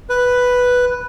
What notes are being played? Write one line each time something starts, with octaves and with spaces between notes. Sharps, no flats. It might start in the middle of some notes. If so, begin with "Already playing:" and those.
B4